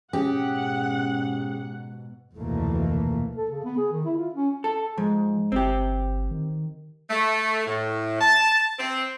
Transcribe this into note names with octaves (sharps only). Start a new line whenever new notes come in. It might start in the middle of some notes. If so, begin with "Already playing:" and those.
G#2 B2 C#4 G4 G#4 F#5
F1 D2 B2 E3 A3 A#3
A4
C#3
B3
G#4
D#3
E4
F4
C#4
A4
G#2 F3
G1 C4 G4
D#3
A3
A2
A5
C4